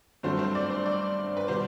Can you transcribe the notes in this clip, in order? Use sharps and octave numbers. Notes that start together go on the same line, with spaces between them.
G2 F#3 A3 C4 C5
C5
D5
C5
D5
B4
B2 G3 C5